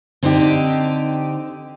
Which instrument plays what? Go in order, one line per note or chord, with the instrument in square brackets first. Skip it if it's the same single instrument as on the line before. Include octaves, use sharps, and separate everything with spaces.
[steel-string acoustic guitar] D3 C4 D4 D#4 G4